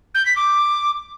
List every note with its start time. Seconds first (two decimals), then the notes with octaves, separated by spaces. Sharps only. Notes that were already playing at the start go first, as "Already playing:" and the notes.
0.14 G6
0.25 B6
0.36 D6